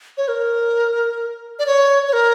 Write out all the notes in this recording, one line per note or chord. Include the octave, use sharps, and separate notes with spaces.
C#5
A#4
D5
C#5
C#5
A#4